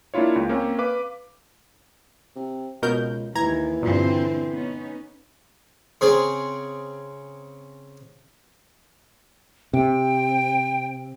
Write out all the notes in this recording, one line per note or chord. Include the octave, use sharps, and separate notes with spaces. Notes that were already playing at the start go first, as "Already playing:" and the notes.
A#3 D4 E4 F4 C#5
C#2
A#3 C4 C#4
B4 F5 D6
C3
C#2 B2 A#4 G6
D#2 E3 A#5 G#6
G2 A#2 D3 C4
B3 C#4 D#4
C#3 C4 G#4
C3 G5